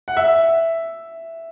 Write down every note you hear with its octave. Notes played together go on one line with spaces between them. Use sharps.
F#5
E5